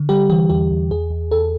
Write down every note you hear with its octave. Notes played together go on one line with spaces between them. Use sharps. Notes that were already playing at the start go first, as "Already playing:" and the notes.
Already playing: D3
G3 G4
E3 G4
E2 G4
E2
E2 G#4
E2
E2 A4